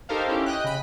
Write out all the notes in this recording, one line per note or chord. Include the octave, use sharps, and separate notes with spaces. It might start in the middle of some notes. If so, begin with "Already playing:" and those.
D#4 G4 A4 A#4 C5 F5
C#4 E4 G4
D#5 G5 F#6
C#3 B5